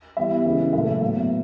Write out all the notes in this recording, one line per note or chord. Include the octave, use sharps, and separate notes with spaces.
E3 G3 B3 E5
C#3 E3 G#3
A#2 F#3 A3 E5
A2 F#3 B3 E5